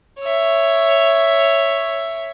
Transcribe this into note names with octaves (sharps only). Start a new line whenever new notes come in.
C#5 E5